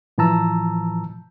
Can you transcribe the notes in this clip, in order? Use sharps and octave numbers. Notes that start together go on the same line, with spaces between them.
A2 E3 F3 A5 A#5 E6